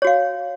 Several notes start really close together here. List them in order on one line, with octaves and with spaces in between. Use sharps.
C#5 F#4 F5